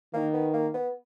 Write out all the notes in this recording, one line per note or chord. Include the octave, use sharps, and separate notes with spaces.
D#3 A#3
B3
A#3
B3